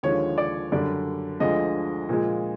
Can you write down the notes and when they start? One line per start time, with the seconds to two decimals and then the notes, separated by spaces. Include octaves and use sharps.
0.03 D#2 D3 F3 G#3 C#5
0.38 D5
0.72 F#2 D3 G3 D5
1.40 D2 D3 F3 G#3 D#5
2.09 A#2 F3 G#3